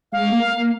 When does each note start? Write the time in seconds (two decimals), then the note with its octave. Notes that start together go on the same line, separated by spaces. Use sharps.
0.12 G#3 F5
0.32 A#3
0.53 A#3